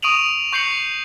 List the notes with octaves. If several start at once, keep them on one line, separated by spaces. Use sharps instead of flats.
C#6 D#6 D7 D#7 F7 F#7
C#6 G6 C7 C#7 F#7